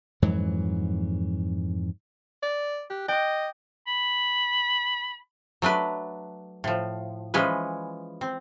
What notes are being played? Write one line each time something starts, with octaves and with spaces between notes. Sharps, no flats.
F2 G#2 E3 F#3
D5
G4 F#6
D#5 G5 D6
B5
F#3 A3 D4 B4
A2 F3
E3 F3 G#3 C#4 B4
C4